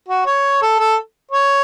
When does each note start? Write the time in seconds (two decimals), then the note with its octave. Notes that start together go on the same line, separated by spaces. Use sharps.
0.08 F#4
0.26 C#5
0.62 A4
0.79 A4
1.31 C#5